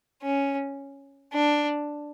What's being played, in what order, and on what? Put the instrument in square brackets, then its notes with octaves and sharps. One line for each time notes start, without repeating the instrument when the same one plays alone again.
[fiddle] C#4
D4